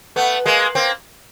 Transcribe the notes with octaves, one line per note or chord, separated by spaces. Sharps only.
A3 B3
G#3 A#3
A#3 C4